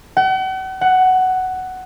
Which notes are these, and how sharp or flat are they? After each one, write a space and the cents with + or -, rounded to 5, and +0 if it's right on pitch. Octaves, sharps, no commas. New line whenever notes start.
F#5 +40
F#5 +10